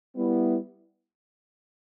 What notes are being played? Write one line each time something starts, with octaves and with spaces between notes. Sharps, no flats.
G3 B3 E4